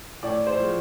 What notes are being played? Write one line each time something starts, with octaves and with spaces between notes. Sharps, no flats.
A2 D5
C5
F3 G#3